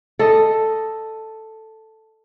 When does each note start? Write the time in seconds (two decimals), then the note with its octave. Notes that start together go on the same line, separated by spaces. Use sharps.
0.19 A4 D#5